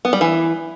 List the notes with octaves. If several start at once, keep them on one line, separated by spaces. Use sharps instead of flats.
B3
G3
E3